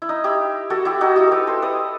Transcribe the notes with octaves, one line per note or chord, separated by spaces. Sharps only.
E4
D#4
E4 G4
F#4 A4
E4 G4
D#4 F#4
E4 G4
G4 A4 B4
A4 C5
B4 D#5